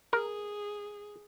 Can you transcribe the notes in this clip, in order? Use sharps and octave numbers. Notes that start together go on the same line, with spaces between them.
G#4 A#4